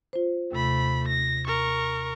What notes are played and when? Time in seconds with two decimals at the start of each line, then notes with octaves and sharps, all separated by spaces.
0.13 F4 C5
0.52 D#2 C3 A3 B5
1.08 A#6
1.47 A#4 C#6